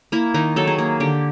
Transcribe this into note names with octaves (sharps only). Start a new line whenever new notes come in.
A#3 E4
D#3 D#4
F#3 A4
G#4
A#3
D3 G4